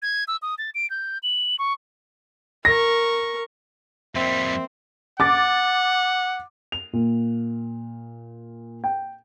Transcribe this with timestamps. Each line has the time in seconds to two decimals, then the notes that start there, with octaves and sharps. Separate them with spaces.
0.02 G#6
0.28 E6
0.42 D#6
0.58 A6
0.75 D7
0.90 G6
1.23 F#7
1.59 C#6
2.65 A#4 C#6 A#6
4.15 F2 G3 A#3 C4 E5
5.20 F#5 D6 A6
6.72 F7
6.93 A#2
8.84 G5